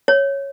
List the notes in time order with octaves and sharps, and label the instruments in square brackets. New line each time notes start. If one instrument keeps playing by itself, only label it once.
[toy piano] C#5